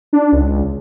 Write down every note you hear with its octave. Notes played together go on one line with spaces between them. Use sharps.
D4
C#2